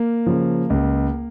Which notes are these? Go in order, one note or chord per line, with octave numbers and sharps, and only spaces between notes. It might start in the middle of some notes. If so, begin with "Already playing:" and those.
Already playing: A#3
C#3 F3
C#2